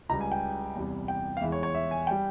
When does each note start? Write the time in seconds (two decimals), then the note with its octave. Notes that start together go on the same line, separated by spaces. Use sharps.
0.09 C#2 C#3 G3 A#5
0.21 G#5
0.32 G5
0.75 E2 C3 G3
1.08 G5
1.37 F5
1.41 E2 E3 G#3 E5
1.52 C#5
1.63 C#5
1.75 E5
1.91 G#5
2.07 G3 G5